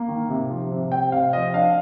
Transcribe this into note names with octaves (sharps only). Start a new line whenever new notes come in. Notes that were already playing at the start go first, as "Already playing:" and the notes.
Already playing: A#3
D#3
C3
F3
C3
C4 G5
C3 F5
F3 D#5
D4 F5